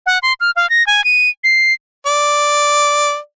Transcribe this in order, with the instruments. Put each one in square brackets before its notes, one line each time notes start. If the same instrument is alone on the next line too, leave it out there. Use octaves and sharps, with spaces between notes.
[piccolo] F#5
C6
F6
F5
A#6
G#5
D#7
C7
[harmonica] D5